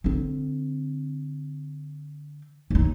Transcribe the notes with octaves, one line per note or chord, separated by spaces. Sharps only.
D3 C4
D#2 D#4